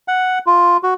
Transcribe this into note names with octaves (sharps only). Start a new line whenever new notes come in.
F#5
F4
F#4